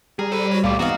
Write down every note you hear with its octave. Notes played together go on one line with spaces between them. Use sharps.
G3 G#4 A#4
A4 C5 B5
F#4 C#5
C#2 A#2 A3 F4 D5
G#2 E3 B3 C4 D#4 F#4 F5